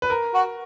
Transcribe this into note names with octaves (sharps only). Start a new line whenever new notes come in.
B4
A#4
F#4